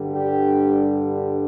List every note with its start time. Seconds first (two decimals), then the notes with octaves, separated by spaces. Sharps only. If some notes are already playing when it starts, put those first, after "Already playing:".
Already playing: G2 D3 G3
0.15 G4